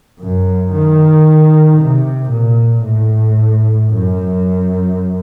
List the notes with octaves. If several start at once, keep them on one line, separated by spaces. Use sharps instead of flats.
F#2
D#3
C3
A#2
A2
F#2